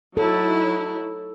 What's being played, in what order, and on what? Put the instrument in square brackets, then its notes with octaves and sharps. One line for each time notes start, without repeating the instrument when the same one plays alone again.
[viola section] F#3 D#4 E4 [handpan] A4